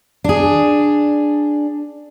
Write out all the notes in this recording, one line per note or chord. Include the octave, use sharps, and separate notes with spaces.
D4 G#4